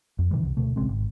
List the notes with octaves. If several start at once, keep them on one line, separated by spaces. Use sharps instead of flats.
F2
B2 D#3 E3 G3
C2
D2 B2 A3
A#1 C#3 G#3 C4
G#1